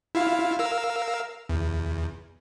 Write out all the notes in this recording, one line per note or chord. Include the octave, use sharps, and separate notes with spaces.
E4 F4 F5
A#4 F5 E6
E2